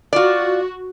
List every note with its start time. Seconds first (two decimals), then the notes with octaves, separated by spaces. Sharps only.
0.13 F4 F#4 D5